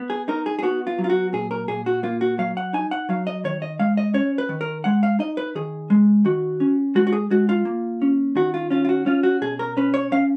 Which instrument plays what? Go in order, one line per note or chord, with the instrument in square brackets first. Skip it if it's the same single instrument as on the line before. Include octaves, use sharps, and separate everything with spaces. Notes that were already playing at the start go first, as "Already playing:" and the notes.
Already playing: [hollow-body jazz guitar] B3
G#4
D#4 A#4
G#4
G#4
B3 F#4
F4
F#3
F4
F#4
A#2 G#4
A#4
A#2 G#4
F#4
A#3 F4
F#4
F#3 F5
F#5
D#4 G#5
F#5
F#3 F5
D#5
D#3 C#5
D#5
G#3 F5
D#5
C#4 C#5
B4
D#3
A#4
G#3 F#5
F5
D#4 D#5
B4
D#3 G#4
G#3
D#3 F#4
C#4
G#3 F#4
F#4
G#4
G#3 F#4
F4
A#3
C#4
D#3 F#4
F4
C#4 F4
F4
F#4
C#4 F4
F#4
B2 G#4
A#4
C#4 B4
C#5
C#4 F5